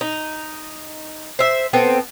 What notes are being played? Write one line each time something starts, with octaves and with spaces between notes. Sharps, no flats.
D#4
C5 E5
B3 C4 A4